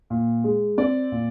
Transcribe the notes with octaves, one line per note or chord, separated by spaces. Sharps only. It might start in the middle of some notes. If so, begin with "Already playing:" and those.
A#2
G#3
C4 D5
A#2